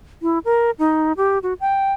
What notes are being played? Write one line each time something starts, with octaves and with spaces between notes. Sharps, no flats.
E4
A#4
D#4
G4
F#4
G5